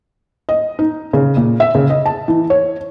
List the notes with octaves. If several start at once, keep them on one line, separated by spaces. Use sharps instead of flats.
D#5
D#4
C#3
A#2
E5
C#3
D#5
A5
E3
C#5